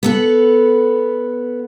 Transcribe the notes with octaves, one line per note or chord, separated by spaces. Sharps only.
B3 A4 F#5